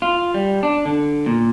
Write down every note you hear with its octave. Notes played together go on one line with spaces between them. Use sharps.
F4
G3
D4
D3
A#2